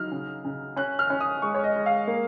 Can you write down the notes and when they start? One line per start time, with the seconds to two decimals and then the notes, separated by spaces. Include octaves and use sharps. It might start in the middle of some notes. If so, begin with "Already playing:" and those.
Already playing: F#3 D#4 F6
0.12 C#3
0.45 C#3
0.76 C#4 F#6
0.99 F6
1.10 C#4
1.21 D#6
1.42 G#3 C#6
1.54 C#5
1.64 D#5
1.76 G#3
1.86 F5
2.07 A#3